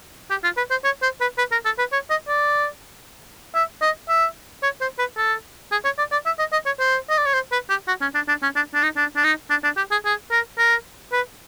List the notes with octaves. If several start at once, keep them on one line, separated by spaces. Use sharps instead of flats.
G4
F4
B4
C5
C#5
C5
B4
B4
A#4
A4
B4
C#5
D#5
D5
E5
D#5
E5
C#5
C5
B4
A4
G#4
C#5
D5
D5
E5
D#5
D#5
C#5
C5
D#5
D5
C#5
C5
B4
G4
F#4
C#4
D4
D4
C#4
D4
D4
D#4
D4
D4
D#4
D4
D4
G4
G#4
G#4
A#4
A#4
B4